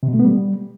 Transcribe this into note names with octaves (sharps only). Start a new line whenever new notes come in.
C3
B2
A3
B3
G3